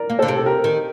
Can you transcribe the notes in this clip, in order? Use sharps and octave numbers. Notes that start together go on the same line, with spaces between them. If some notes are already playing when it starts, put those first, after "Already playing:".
Already playing: A#4 D5
A#3
A4 C5
D3
C3
A4
G4 A#4
D#3